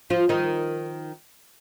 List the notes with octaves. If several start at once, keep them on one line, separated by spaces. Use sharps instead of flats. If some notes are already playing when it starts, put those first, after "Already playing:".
F3 F4
D#3 D#4